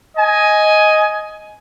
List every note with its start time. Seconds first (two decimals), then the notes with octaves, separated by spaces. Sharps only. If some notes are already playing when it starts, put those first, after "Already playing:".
0.16 D#5 G#5